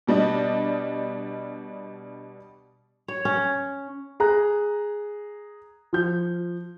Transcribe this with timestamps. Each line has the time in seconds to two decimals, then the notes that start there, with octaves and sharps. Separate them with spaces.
0.07 B2 G3 D4 D#5
3.08 C#5
3.25 C#4
4.20 G#4 A#5 F#6
5.93 F3 G6